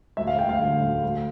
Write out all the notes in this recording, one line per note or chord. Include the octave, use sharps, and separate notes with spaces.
D2 E5
F5
D2 G5
F5
D3
D2
D2